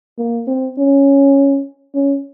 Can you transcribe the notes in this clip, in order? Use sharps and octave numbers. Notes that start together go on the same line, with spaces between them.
A#3
C4
C#4
C#4